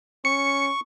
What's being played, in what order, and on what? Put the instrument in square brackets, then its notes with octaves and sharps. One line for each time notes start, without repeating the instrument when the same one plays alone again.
[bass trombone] C#4 [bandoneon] C#6 [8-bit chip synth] C#7